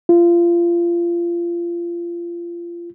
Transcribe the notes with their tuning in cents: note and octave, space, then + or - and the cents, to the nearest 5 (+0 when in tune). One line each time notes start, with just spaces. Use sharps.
F4 -25